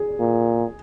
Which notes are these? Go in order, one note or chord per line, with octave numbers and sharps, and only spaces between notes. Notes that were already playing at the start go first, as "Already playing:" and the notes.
Already playing: G#4
A#2